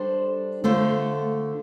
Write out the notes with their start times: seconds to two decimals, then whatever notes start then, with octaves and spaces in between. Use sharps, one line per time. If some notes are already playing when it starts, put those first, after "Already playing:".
Already playing: G3 D4 A4 C5
0.64 D3 A3 F4 C5